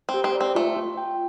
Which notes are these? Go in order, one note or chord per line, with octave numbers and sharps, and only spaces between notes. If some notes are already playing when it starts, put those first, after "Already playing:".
C4
G4
C4
D5
C4
A3 F4
F4
G5